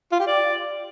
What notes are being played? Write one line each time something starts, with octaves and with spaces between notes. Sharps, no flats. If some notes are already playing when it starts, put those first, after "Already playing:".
F4
G4
D5